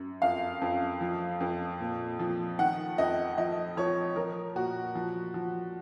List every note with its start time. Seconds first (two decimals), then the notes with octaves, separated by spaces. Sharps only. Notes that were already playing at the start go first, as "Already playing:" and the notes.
Already playing: F#2
0.22 F2 F5
0.61 F2
1.01 F3
1.40 F2
1.80 A#2
2.19 F3
2.59 D#3 F#5
2.98 F2 D#5
3.38 F3 D#5
3.77 F3 C#5
4.16 F3 A#4
4.55 A#2 F#4
4.95 F3
5.34 F3